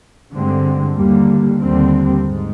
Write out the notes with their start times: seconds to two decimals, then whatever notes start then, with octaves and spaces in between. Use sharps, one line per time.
0.33 G2 D3 G#3 C4
0.96 D#2 D3 G3 A#3
1.60 D#2 D3 G3 C4
2.24 G#2